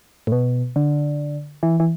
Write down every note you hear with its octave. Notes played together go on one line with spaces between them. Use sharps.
A2
B2
D3
E3
E3